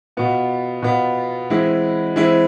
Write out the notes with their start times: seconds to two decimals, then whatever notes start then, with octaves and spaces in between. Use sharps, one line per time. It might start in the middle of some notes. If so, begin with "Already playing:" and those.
0.17 B2 B3 F4
0.83 B2 B3 F4
1.50 E3 G#3 C4 E4
2.16 E3 G#3 C4 E4